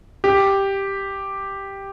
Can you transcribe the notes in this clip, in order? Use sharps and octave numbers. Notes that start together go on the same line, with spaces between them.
G4